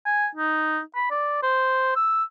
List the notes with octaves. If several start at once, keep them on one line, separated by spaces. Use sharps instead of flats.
G#5
D#4
B5
D5
C5
E6